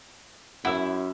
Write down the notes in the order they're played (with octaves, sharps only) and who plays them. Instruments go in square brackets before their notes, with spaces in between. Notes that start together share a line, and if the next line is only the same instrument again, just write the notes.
[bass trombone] F#2 [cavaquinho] E4 [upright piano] F#5 E6